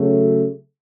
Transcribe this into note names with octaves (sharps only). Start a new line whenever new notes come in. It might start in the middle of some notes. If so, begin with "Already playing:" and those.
Already playing: C#3 F#3 A3